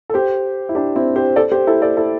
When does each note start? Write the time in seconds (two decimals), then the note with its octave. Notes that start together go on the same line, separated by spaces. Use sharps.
0.10 A4
0.14 G4 C5
0.69 E4
0.75 D4 G4
0.96 C4 E4
1.16 G4 C5
1.36 A4 D5
1.52 G4 C5
1.67 E4 A4
1.82 A4 D5
1.97 E4 A4